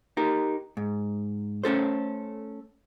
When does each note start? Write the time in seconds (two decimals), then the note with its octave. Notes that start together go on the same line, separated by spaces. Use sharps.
0.17 D#4 G4 A#4
0.77 G#2
1.64 A3 C#4 A4 C5